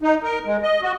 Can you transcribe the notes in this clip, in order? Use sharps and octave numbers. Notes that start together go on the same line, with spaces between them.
D#4
A#4
G#3
D#5
F#4